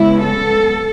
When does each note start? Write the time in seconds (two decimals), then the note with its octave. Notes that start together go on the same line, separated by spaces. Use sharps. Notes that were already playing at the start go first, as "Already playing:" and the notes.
Already playing: C#3 G#3 B3 E4
0.24 A4